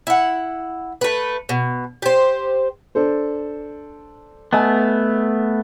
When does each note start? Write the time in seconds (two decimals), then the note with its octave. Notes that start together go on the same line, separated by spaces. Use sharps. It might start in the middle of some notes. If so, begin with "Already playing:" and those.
0.07 E4 F#5
1.01 A3 B4
1.49 B2
2.02 G4 C5
2.95 D4 A4 C5
4.53 A3 B3 D#5 G#5 A5